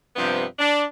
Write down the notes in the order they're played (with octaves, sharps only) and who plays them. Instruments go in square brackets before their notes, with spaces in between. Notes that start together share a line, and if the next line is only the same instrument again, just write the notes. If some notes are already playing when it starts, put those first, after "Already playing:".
[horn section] G2 C3 F3 B3 C4 G4
D4